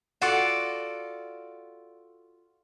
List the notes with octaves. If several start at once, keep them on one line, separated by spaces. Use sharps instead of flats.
F4 F#4 A4 D5